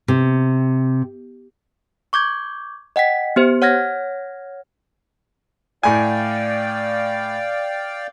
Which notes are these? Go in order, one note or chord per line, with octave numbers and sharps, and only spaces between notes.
C3
C#6 D6 G6 G#6
D#5 F#5 G5 B6
B3 G4 C5
C#5 F#5 F6 G#6 A#6
A2 D5 F5 G5 G#5